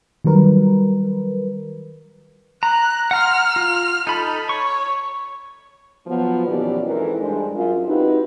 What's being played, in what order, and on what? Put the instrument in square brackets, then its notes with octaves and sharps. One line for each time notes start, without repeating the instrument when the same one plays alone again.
[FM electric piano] D#3 F#3 G3 A#4 B4
[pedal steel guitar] A#5 [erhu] F#6
[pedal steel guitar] F#5 A#5 C6 [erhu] F6
[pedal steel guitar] F4
[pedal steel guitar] D#4 B5 [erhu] A4
[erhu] C#5 [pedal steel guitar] C#6
[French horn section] F3 F#3 B3
D#2 B2 E3 C#4 G4 D5
F2 G#2 E3 C4 A4 A#4
G2 G#3 D4 C5
F#2 F4
C4 D#4 E4 F#4 G4 B4